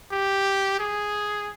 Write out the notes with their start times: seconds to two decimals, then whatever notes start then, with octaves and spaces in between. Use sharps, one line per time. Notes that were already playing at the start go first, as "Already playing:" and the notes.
0.12 G4
0.79 G#4